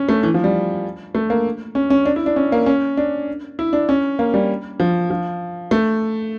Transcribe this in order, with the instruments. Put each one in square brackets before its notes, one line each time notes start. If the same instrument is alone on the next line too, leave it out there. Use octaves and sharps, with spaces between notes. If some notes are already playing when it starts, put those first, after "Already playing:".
Already playing: [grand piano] C#4
A3
E3
F3
G3
A3
A#3
C#4
C#4
D4
E4
D4
C#4
A#3
C#4
D4
E4
D4
C#4
A#3
G3
F3
F3
A3